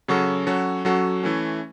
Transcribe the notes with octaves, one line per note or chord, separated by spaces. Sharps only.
C#3 F#3 C#4 F#4 A4
F#3 C#4 F#4 A4
F#3 C#4 F#4 A4
E3 A3 C#4